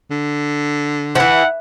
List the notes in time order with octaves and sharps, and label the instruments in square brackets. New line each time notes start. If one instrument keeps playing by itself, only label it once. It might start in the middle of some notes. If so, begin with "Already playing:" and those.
[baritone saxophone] D3
[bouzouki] E3 F3 [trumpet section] E4 F#5